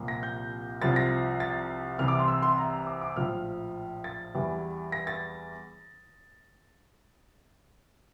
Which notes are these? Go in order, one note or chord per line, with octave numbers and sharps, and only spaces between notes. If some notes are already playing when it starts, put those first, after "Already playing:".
Already playing: C2 A#2 F3
A#6
G6
C2 C3 F3 A6
A#6
A6
C2 C3 E3 F6
D6
C6
E6
C6
A#5
D6
D6
A#1 A2 F3 F6
A6
E2 E3 G3
A#6
A6